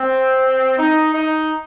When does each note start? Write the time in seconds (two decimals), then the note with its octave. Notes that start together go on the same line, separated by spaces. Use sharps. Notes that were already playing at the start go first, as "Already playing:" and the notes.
Already playing: C4
0.78 D#4
1.13 D#4